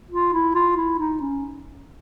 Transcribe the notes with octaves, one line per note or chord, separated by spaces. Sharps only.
F4
E4
F4
E4
D#4
C#4